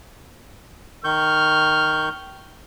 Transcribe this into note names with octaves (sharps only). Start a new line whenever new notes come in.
D#3 C#6 F6 G6